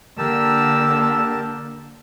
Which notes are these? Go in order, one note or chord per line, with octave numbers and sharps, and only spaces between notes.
D3 A#3 G4 A#4 A5 E6